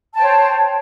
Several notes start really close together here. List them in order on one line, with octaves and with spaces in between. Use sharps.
A5 G5 C5 C#5